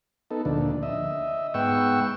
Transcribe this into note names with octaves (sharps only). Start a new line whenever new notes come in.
B3 D#4 A4
D2 A#2 D3 F3 D4
D#5 E5
G#2 B3 F#5 G5 C#6 E6